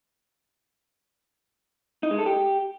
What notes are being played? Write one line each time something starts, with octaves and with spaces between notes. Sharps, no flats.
D#4
G#3
A4
G4